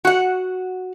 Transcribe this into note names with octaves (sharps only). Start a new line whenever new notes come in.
F#4 F#5